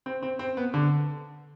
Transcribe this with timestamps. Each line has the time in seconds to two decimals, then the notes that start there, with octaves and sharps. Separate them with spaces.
0.06 C4
0.22 C4
0.39 C4
0.57 B3
0.74 D3